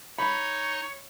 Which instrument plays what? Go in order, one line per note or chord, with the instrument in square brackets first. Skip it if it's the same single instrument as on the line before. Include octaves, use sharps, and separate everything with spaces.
[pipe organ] D#4 [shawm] C#5 [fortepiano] B5